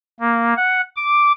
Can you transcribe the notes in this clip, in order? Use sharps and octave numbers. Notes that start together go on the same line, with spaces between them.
A#3
F#5
D6